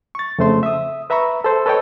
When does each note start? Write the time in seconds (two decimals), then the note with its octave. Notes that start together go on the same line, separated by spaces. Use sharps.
0.15 C#6 A6
0.39 F2 C#3 A3 C5 C6
0.63 E5 D#6
1.10 B4 E5 A#5 B5 C#6
1.44 A4 C5
1.66 A4 B4 C#5 D#5 G5